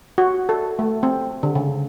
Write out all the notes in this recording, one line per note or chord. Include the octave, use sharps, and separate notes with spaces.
F#4
A4
A3
C4
D3
C#3